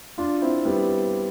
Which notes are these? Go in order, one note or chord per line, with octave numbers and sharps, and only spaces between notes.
D4 F4
C4 E4
G3 B3